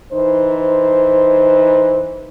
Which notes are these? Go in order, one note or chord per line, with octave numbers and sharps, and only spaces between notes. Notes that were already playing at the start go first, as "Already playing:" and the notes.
E3 D#4 C5